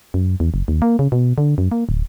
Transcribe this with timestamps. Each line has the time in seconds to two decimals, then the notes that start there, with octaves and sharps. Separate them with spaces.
0.14 F#2
0.40 E2
0.54 F#1
0.68 D#2
0.82 A#3
0.99 C#3
1.12 B2
1.38 D3
1.58 F#2
1.72 A#3
1.89 D1